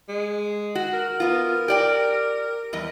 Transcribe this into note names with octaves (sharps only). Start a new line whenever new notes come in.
G#3
F#4
A#4
B3 F4
G4 D5 G5
E2 G3 D#5